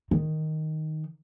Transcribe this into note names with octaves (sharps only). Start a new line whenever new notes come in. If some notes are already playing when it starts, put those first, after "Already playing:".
D#3